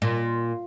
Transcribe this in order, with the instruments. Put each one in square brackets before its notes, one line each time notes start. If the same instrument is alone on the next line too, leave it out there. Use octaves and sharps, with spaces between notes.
[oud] A#2